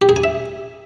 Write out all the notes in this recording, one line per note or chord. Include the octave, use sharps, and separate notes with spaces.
G4
G#4
G#5
E5